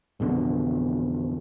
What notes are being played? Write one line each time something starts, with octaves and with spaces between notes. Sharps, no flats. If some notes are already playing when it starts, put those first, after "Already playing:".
A1 F2 B2 D3